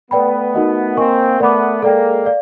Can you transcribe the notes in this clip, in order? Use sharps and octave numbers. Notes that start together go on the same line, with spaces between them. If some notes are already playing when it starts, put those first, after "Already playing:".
A3 B3 B4 D5 G5 B5
D#4 F#4 A#4 D#5 F#5
A#3 C4 A#4 D#5 G#5 C#6
A3 B3 A#4 D5 F#5 B5 D6
G#3 A#3 A4 D5 G5
D5 F5